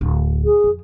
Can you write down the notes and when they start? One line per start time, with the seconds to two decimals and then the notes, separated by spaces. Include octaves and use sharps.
0.01 D1
0.45 G#4
0.64 F2